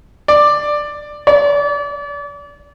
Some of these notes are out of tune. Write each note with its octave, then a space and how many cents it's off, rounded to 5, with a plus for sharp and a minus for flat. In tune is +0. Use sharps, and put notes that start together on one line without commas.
D5 +10
D5 -35